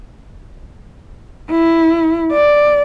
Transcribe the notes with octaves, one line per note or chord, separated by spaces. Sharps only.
E4
D5